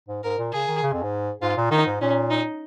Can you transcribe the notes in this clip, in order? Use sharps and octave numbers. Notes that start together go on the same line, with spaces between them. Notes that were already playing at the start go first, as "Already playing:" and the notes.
G#2
G#2 A#4
A#2
C#3 G#4
D#3
C#3
F2
G#2
G#2 F4
A#2
D#3 D#4
G#2
A#2 C#4
D#4